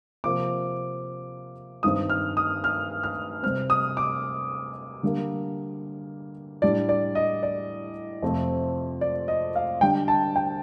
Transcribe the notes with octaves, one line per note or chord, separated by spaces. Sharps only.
C3 F3 A#3 D6
G2 D#3 G3 C4 D#6
F6
D#6
F6
F6
C3 G3 C4 F6
D#6
D6
D3 G3 A#3
A2 G3 D4 D5
D5
D#5
D5
F2 C3 F3 A3 C4
D5
D#5
F5
D3 G3 D4 G5
A5
G5